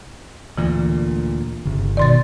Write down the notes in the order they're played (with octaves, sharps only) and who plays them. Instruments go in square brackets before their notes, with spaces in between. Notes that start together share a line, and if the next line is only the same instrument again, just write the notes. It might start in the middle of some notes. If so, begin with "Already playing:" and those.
[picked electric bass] D2 A#2 [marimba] E3
[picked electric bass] G1 [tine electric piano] C#3
[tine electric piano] B2 D#3 [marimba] D5 C6 A6